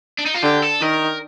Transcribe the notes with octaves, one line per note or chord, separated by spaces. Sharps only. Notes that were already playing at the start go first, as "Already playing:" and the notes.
D4
D#4
F4
D3 G4
A4
D#3 A#4